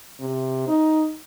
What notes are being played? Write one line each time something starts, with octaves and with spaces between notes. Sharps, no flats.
C3
D#4